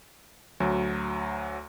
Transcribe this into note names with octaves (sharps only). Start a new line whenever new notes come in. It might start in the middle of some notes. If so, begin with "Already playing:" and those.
D2 F#3